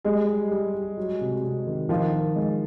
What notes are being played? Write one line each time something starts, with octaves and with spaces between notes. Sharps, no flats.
G3 G#3 G#4
G3
G3
G3
F#3
C3
C3
D#3
D#3 F3 F4
D#3
G#3